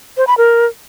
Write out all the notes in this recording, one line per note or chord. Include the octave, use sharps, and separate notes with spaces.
C5
B5
A#4